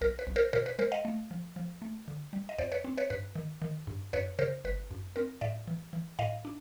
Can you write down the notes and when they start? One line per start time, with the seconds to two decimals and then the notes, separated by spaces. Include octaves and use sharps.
0.01 B1 A#4
0.19 B4
0.27 B1
0.36 A#4 C5
0.53 B2 A#4 C5
0.66 B4
0.79 G#3 A#4 C5
0.92 D#5 F5
1.05 A3
1.31 F3
1.56 F3
1.82 A3
2.08 D3
2.33 G3
2.49 D#5
2.58 F2 C5 D5
2.72 B4 C#5
2.84 C4
2.98 B4 C#5
3.10 G2 B4
3.35 D#3
3.62 D#3
3.87 G2
4.13 F#2 B4 C#5
4.39 C#3 A#4 C5
4.65 G1 B4
4.91 F#2
5.16 C4 A#4
5.41 A2 D5 E5
5.67 E3
5.93 E3
6.19 A2 D#5 F5
6.45 D4